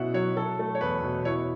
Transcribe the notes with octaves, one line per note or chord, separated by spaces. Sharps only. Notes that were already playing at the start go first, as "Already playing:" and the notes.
Already playing: B2 F#3 C#4 E4 E5 F#5
F#3 C#5
F#3 A4
A3
C#5
E2 B4
B2
E4 C#5